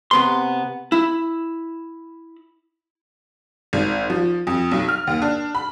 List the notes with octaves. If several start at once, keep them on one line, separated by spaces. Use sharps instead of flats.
C3 B3 C6
E4
G#1
F3
F2
B1
F6
D#2
D4
B5